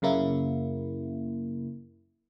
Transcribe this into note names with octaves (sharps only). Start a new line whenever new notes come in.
F#2 C#3 A#3 E4